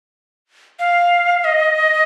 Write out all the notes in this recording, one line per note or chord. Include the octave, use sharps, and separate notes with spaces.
F5
D#5